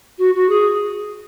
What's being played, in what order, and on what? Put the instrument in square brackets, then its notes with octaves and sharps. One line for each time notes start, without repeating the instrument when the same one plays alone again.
[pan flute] F#4
F#4
G#4